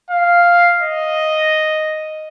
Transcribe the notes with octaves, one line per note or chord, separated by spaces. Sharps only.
F5
D#5